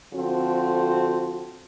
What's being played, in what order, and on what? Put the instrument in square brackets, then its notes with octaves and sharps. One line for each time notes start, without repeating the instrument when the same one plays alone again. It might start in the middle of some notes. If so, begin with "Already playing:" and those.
[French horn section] D3 F3 C4 F#4